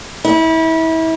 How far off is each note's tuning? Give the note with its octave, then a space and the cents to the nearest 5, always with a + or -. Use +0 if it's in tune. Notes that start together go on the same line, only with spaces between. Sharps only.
E4 -30